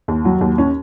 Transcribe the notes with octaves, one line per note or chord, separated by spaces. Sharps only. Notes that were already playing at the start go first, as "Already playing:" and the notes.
D#2
F#3
D#2
C#4